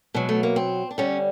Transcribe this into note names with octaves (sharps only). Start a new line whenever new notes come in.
B2 F#3 G#3
A3
A#3
C4
D4
D3 G3 C#4